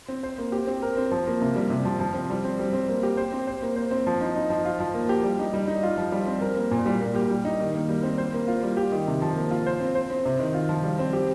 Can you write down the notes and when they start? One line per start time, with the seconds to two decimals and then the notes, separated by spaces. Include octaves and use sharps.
0.08 C4
0.23 C5
0.38 A#3
0.52 G4
0.67 C4
0.82 A#4
0.97 C4
1.12 F3
1.27 A#3
1.41 C3
1.56 G3
1.70 C3
1.85 F3
2.00 F3
2.14 C4
2.30 G3
2.44 C4
2.59 G3
2.73 C4
2.89 A#3
3.03 G4
3.17 C5
3.32 C4
3.47 C5
3.62 A#3
3.76 C5
3.91 C4
4.07 F3
4.21 D#4
4.36 D#4
4.50 F3
4.65 F4
4.80 F3
4.94 A#3
5.09 G4
5.23 G3
5.39 D#4
5.54 G3
5.68 D#4
5.83 F4
5.98 F3
6.12 G3
6.27 C4
6.41 A#4
6.57 A#3
6.71 A#2
6.86 G3
7.01 A#3
7.15 G4
7.30 G3
7.45 D#4
7.60 D#3
7.75 A#3
7.89 G3
8.03 C4
8.18 C5
8.34 A#3
8.48 F4
8.63 G3
8.77 G4
8.92 D#3
9.07 C3
9.22 F3
9.36 A#3
9.51 F4
9.66 C5
9.80 C4
9.95 C5
10.10 C4
10.25 C3
10.39 D#3
10.54 F4
10.69 F3
10.84 G3
10.99 C4
11.13 G4